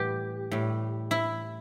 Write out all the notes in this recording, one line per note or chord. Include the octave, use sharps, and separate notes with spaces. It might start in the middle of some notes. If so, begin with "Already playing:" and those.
Already playing: A2 E3 G3 G4 B4
A2 G3
E4